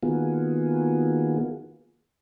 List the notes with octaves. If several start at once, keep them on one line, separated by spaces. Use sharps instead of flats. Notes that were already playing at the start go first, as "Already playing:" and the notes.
D#3 A#3 B3 F4 F#4 G#4